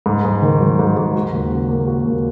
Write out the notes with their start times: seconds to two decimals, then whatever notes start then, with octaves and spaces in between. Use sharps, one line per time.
0.06 G#2
0.25 G#2
0.42 D#3
0.61 F#3
0.79 G#2
0.97 G#2
1.15 F#4
1.32 D#2
1.51 C#3
1.69 A#3
1.88 F#4
2.05 D#2